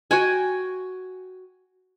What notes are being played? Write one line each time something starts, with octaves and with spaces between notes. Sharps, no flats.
F#4 G5 G#5